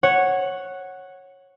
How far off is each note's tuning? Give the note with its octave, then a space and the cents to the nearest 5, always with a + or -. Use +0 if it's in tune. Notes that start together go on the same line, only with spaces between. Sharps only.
C#5 -10 F#5 +0